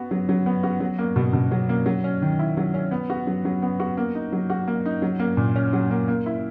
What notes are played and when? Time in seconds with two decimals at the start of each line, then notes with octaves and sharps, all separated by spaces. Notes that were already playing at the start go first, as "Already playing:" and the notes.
Already playing: B3 F#4
0.11 F#3
0.29 F#3
0.46 B3
0.63 F#4
0.80 F#3
0.99 A#3
1.16 B2
1.33 B2
1.51 F#3
1.69 A#3
1.86 F#3
2.04 C#4
2.22 D#3
2.39 E4
2.57 F#3
2.74 C#4
2.91 B3
3.10 F#4
3.27 F#3
3.45 F#3
3.62 B3
3.80 F#4
3.97 A#3
4.15 D#4
4.32 F#3
4.50 F#4
4.68 A#3
4.86 D#4
5.02 F#3
5.19 A#3
5.37 A#2
5.56 C#4
5.73 F#3
5.91 A#3
6.08 A#3
6.26 E4